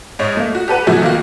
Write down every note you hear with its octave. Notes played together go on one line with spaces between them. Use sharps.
G#2 C#5 D#5
A3 A#3
F#4
G4 A4 B4 F#5
C3 F#3 A3 E4 F#4 G#4
D#3 A#3 F4 F#4